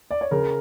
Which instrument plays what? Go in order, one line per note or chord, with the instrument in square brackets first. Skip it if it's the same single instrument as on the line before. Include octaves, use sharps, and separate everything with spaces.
[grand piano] D5
C#5
[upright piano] C#3 [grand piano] A#4